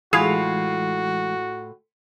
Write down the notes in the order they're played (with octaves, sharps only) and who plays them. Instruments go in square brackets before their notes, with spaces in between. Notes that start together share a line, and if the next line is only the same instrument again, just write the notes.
[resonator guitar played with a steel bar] A2 F4 [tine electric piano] E3 G#3 [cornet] F#4 [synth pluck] G#4